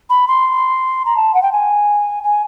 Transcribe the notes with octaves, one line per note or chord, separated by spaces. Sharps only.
B5
C6
A#5
A5
F#5
G5
G#5
G#5